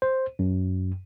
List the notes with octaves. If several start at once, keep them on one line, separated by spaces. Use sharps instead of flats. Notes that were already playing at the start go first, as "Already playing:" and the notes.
C5
F#2